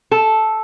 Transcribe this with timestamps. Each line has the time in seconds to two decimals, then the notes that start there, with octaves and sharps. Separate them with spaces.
0.11 A4